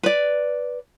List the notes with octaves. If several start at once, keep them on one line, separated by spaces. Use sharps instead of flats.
B4 D5